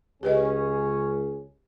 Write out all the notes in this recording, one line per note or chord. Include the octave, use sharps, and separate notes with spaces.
C#2 C#4 G4 G#4 B4 D#5